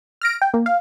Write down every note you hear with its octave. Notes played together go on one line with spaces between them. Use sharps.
F6 A#6 D7
G5
A#3
F5